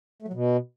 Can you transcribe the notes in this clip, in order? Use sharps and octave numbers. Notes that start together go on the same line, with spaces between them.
A3
F#3
B2